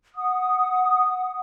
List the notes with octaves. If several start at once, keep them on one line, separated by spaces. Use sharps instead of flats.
F#5 D#6